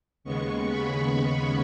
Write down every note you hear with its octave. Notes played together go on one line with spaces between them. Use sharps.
D#2 C#3 G#3 B3 C#6
B5